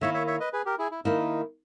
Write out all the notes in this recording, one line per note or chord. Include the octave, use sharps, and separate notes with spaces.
D#3 A#3 E4 C#5 E5
C#5 E5
C#5 E5
B4 D#5
G#4 B4
G4 A#4
E4 G#4
E4
D#3 A#3 D#4 E4